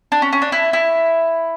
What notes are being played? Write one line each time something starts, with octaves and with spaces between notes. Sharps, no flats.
D4
C#4
C#4
D4
E4
E4